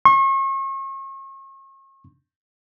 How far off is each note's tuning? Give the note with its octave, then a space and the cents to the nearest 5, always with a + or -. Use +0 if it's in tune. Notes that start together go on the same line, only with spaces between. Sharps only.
C#6 -40